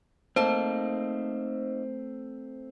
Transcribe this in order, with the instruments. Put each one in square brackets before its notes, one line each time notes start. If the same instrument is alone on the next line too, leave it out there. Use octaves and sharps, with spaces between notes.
[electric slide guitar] A3 C4 [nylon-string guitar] A#3 D#4 A5 [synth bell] C5